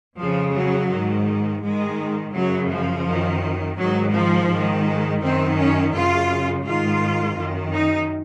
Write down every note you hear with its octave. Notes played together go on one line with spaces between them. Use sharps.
F2 C#3 F3
F#3
G#2 D#3
G#2 D#3 G#3
F#2 C#3 F#3
F3
F#2 D#3
G#2 D#3 F#3
F3
G#2 D#3
G#3
F#2 D#3 C4
C#4
F#2 C#3 F4
G#2 D#3 F4
F#2 D#3
D#4